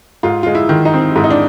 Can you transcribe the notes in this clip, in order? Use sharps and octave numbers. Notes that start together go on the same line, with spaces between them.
G#2 F4
G#3 F4
E4
D#3
D#4
C4
G#2 E4
D#4
D4